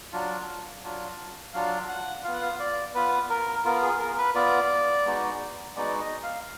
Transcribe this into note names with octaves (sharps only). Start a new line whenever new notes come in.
F#3 D4 F4
F#3 D4 F4
F#3 D4 F4 F5
F#5
B3 F4 F5
F#5
F5
D5
B3 F4 B4
A#4
B3 F4 A#4
G#4
A#4
B4
B3 F4 D5
G#3 B3 D#4 F#4
G#3 B3 D#4 F#4 D5
D#5
F5